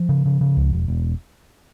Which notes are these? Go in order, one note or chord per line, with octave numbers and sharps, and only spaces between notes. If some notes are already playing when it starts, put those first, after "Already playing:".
Already playing: F3
C#3
C#3
C#3
C#2
E1
E1